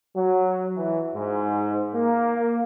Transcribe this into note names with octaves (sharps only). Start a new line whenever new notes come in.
F#3
E3
G#2
A#3